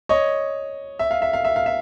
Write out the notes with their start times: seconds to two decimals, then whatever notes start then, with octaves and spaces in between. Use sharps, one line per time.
0.09 C#5 D#5
0.99 E5
1.11 F5
1.22 E5
1.33 F5
1.45 E5
1.56 F5
1.66 E5